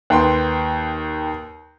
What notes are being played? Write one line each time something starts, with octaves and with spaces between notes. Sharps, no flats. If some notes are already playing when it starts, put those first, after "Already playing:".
D#2 B4 G5 C6